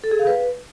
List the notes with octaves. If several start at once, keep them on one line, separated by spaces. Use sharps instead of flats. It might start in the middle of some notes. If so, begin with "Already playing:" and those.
A4
G#4
F5
B4